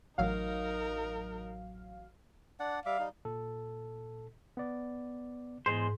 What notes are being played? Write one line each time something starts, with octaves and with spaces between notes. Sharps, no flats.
A1 F#3 D#4 A#4 F5
D4 D5 F#5
G3 E5 F5 D6
G3 D#4
A#2 A4
B3 D5
E2 G#2 G#3 C5